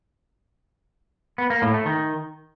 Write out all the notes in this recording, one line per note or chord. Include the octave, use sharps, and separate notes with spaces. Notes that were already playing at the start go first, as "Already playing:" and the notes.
B3
A#3
A2
A3
D#3